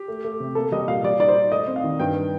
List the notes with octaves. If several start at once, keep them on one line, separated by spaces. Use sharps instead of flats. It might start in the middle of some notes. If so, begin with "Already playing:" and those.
Already playing: G4
A3
A3
C3
A#3 A4
G3 D#5
A#2 F5
G3 D5
D#4 D5
C5
D#4
A3 D#5
C4
F5
D#3
G2 G5